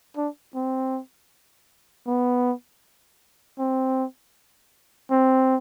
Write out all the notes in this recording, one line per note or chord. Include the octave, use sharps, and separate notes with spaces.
D4
C4
B3
C4
C4